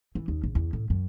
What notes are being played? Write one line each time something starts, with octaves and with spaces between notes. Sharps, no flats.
E3
D#2
A#1
E2
A2
F#2